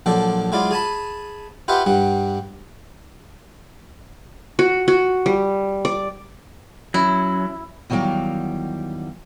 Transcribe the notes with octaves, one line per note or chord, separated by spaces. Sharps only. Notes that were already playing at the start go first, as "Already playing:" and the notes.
A#1 F3 F#3 A4 D5
F#3 G#3 E4 F4 D5
G#4 G#5 A5 B5
F4 G4 B4 C5 E5 F#5
G2 G3 F#5
F#4
F#4
G3
D5
F#3 C#4 E4
E2 D#3 F#3 G3 F5 G5